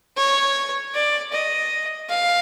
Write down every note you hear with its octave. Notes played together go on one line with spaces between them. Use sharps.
C#5
D5
D#5
F5